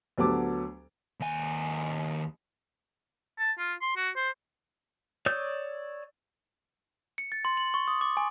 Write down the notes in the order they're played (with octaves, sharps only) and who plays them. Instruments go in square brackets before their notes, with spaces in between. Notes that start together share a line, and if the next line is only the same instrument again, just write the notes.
[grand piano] D2 F#3 B3 G4 A4 D6
[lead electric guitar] D#2 G#5
[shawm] A5
F4
C6
F#4
C5
[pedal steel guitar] C#5 D5 D#6 E6 G6
[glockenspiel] C#7
A6
C6
F#7
C#6
D#6
D6
G#5